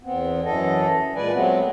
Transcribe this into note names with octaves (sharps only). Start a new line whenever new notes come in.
E2 B3 C4
F#2 E3 A4 D#5
A#2 G#3 B4 D5 G#5
F#3 G#3 A3 B3 C4